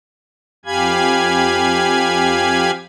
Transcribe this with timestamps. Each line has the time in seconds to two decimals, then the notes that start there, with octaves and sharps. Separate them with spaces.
0.65 F2 G4 F5 G#5 B5 G#6